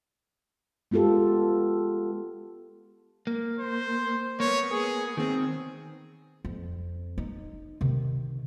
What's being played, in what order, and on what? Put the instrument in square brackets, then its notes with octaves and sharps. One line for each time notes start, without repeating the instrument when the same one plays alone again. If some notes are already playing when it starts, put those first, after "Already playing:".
[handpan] G#3 B3 F4 G4 A4
[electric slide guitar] A#3
[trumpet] C5
[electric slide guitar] A#3 B3 [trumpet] C#5
[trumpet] G#4
[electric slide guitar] D#3 C4 [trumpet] G#4
[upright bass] F2
D#4
C3 D#3